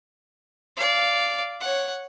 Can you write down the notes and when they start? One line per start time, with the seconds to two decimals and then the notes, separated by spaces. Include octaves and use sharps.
0.76 D5 F5
1.61 C#5 F#5